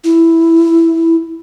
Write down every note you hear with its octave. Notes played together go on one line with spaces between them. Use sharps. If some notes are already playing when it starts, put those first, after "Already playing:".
E4